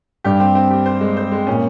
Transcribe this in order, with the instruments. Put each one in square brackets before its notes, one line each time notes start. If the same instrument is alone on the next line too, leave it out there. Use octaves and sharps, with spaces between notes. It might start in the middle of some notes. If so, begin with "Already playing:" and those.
[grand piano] G2 [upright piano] G4
[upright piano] C4
C4
G4
C5
G#3
C5
G#3
[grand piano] A#2 [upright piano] C#4